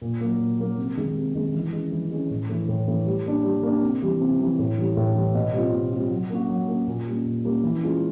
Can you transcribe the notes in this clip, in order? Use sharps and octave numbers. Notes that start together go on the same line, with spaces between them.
A#2
F#3 A#3
A#2
F#3 A#3
C3
D#3 G#3
C3
D#3 G#3
E3
G#3 C#4
E3
G#3 C#4
A2
E3 A3
A2
E3 A3
G3
A#3 D4
G3
A#3 D4
C3
E3 G3
C3
E3 G3
A2
E3 G3
A2
E3 G3
B2
G3 C4 F4
B2
G3 C4 F4
F#3
A#3 C#4 F#4
F#3
A#3 C#4 F#4
A#2
G3 A#3 C#4
A#2
G3 A#3 C#4
E3
G#3 C#4 F4